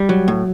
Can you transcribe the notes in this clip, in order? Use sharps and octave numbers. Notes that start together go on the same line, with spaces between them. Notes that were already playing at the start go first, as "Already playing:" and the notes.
Already playing: G3
F#3
A2